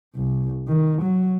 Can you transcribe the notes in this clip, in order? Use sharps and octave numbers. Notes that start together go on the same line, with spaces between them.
C2
D#3
F#3